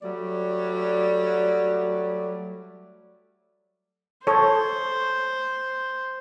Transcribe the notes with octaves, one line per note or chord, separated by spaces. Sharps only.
F#3 G3 A3 D5
A4 C5 C#5